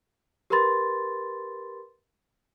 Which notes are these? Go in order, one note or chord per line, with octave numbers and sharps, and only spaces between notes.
G4 A#4 B4 B5 C6 A6